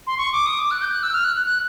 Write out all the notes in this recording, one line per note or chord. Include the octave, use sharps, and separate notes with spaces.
C6
C#6
D6
D#6
D6
F#6
G6
F#6
E6
F6
F#6
F#6
F#6